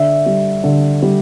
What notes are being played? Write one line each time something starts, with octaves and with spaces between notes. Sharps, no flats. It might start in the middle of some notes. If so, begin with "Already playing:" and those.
Already playing: D3 E5
G3
D3
G3